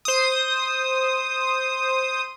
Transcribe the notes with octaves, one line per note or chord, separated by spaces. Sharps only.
C5 D#6